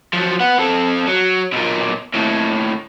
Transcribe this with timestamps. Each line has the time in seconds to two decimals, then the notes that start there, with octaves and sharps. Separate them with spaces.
0.14 F3 F#3
0.40 B3 F#5
0.59 C4 A4
1.07 F#3
1.53 B1 A#2
2.14 D#2 A2